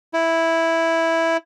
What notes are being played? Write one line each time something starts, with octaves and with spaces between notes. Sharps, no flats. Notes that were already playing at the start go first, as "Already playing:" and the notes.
E4